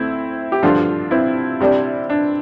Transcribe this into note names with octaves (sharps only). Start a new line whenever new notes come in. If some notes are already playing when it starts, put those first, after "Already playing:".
Already playing: D2 A3 C4 E4
G4
G2 D3 F3 D4 F4
C4 E4
C3 G3 D4
D4